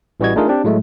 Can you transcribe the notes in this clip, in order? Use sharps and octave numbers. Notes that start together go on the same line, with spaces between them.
A1 E3 G3 F#4 D#5 G#6
A3 D4 D#4 F4 G#4 A#4
C4 D4 G4
A2 F#3 G#3 A3